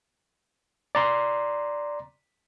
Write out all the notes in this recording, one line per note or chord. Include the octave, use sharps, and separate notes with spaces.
D5 A#5 C6